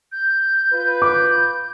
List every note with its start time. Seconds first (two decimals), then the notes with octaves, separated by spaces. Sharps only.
0.12 G6
0.72 F4 B4
1.02 D6 G6